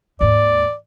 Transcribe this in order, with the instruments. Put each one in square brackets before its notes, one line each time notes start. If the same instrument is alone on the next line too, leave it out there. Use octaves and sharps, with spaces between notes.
[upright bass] D#2 G#2 [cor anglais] D5